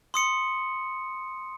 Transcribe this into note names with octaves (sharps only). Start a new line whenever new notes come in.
C6 D#6 C#7